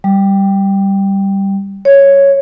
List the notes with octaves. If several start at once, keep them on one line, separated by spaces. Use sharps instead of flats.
G3
C#5